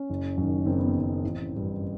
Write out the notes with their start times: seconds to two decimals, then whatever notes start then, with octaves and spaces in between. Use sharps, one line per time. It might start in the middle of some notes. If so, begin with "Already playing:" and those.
Already playing: C#4
0.10 F#1
0.38 F#2 D#3
0.66 F#1 C4
0.77 B3
0.88 C4
0.95 F#2 D#3
1.23 A1
1.52 G2 E3